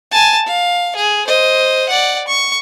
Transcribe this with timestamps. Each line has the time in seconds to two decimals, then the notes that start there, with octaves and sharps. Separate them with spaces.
0.11 G#5 A5
0.47 F5
0.96 G#4
1.27 C5 D#5
1.89 D5 F#5
2.28 C#6